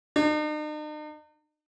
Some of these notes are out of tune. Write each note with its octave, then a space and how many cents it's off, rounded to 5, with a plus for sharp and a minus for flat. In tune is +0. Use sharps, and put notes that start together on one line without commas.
D#4 -45